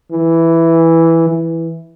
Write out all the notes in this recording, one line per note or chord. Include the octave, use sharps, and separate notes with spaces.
E3
E3